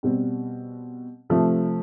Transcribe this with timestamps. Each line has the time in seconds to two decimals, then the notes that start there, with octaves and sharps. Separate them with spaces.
0.03 B2 G3 C4
1.30 C3 F3 A3